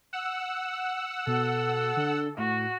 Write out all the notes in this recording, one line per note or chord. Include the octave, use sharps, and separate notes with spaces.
F#5 E6
B2 A4
D3
A2 F#4